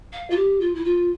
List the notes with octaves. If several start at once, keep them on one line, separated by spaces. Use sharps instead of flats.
F5
F4
G4
F4
E4
F4